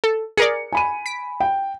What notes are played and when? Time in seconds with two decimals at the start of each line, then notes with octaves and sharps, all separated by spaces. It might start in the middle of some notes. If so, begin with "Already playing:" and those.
0.04 A4
0.37 G#4 A#4 D5 C#7
0.72 G#5 B5 D#7
1.06 B6 D7
1.40 G5